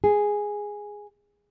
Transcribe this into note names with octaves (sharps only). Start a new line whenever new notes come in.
G#4